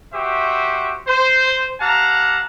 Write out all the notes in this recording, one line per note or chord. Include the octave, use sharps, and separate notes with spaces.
F#4 G4 C5 E5
C5
G4 F5 F#5 A5 A#5